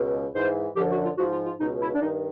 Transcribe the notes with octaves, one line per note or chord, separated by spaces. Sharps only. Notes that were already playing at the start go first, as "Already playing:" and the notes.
Already playing: C#2 B2
G#2 E3 C5
F#2 D3 F3 G4
F#4
F4
G#2 F3 F#4
F4
F4
C#2 B2 D#4
E4
D4
G2 D#3 D#4